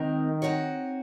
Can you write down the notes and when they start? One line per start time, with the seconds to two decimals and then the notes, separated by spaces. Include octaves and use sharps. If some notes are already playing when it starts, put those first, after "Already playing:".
Already playing: D#3 G#3 C4 D#4 A#4
0.42 C4 D#4 F#4 C#5